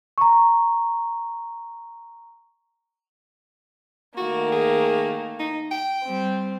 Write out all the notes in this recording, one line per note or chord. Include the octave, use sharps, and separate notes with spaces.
A#5 C#6
D#3 A3 A#3 F#4
G#4
D#4
G5
G3 C4